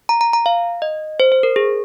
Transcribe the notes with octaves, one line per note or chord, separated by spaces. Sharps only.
A#5
A#5
A#5
F5
D#5
C5
C5
A#4
G#4